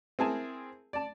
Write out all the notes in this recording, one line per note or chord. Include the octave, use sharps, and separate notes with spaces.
C4 E4 G#4 A#4 G#5 A5
D5 A5